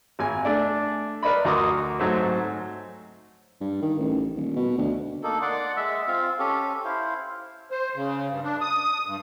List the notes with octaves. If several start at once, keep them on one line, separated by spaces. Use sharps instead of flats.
G#1 G#5
A3 D4 D5
A#4 B4 D5 D#5 B5
D2 F#4 A#5 C6 D6 D#6
G#2 F#3 A3 C4
G2
D#3
A1
D#1
B2
D2
A#3 D#4 A4
D5 F#5 C6 D6
G#3 E5 E6
C4 F4 F5
C#4 G4 A4
E4 C5 F5
C5
C#3
G2
D4
D#6
G2